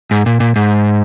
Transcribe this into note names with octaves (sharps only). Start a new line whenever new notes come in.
G#2
A#2
A#2
G#2